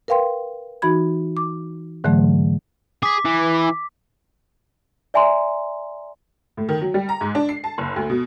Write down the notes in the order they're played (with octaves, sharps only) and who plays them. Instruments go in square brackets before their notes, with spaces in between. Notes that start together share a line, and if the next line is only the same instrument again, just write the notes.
[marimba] A#4 B4 F5 G5 C6
E3 D#4 F#4 B5 G#6
D6
G#2 D3 E3 F#3 A3
[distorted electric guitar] G#4 [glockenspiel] D6 B6
[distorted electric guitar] E3
[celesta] D5 E5 G#5 A#5 C6
[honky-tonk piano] A2
D#3
F#3
G3
A#5
G#2
D4
C7
A5
F#1
D2
B2